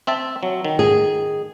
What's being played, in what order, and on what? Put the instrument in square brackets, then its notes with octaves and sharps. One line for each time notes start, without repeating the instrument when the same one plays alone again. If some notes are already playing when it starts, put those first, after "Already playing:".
[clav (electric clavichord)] C4 E5 A5
F#3
D#3
[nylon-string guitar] G#4